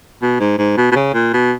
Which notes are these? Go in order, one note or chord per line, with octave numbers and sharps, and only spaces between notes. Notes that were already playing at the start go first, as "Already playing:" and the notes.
B2
G#2
G#2
B2
B2
C#3
A#2
B2